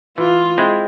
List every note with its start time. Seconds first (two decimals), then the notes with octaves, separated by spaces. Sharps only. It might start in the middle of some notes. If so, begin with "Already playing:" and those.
0.18 E3 F4
0.58 G#3 C4 E4